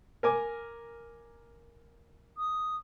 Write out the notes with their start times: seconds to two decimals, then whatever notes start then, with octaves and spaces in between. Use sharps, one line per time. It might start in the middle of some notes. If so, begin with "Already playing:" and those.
0.23 A#4 G#5 D6
2.38 D#6